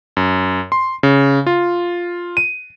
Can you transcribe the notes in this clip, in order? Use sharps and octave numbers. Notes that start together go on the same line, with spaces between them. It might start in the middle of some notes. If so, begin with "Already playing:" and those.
F#2
C6
C#3
F4
D#7